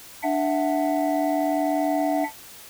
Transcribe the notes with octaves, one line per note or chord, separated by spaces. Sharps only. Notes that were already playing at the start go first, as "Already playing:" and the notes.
D4 E5 F#5